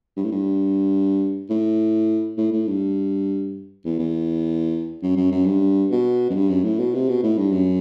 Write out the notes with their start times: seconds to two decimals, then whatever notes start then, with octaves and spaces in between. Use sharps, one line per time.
0.17 G2
0.25 A2
0.32 G2
1.50 A2
2.38 A2
2.52 A2
2.68 G2
3.85 E2
3.99 E2
5.03 F#2
5.17 F#2
5.32 F#2
5.46 G2
5.91 B2
6.30 F#2
6.35 G2
6.49 F#2
6.64 A2
6.80 B2
6.94 C3
7.09 B2
7.23 A2
7.38 G2
7.52 F#2